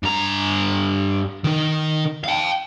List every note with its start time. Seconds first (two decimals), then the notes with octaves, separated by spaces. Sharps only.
0.03 G2 A#5
1.44 D#3 D#4
2.24 F5 G5